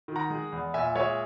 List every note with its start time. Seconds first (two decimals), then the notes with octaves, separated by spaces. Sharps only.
0.08 D#3
0.16 F#5 A#5
0.30 G#3
0.52 E2
0.74 A#2 E5 G#5
0.96 G#3 C#5 E5